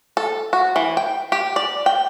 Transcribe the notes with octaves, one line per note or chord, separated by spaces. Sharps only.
A4
F#4
E3
G5
G4
D5
G5